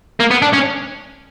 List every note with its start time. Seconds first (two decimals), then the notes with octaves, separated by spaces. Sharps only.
0.20 A#3
0.31 B3
0.42 D4
0.53 C#4